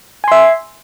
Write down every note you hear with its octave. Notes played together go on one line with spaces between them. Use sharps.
E5 G#5 C6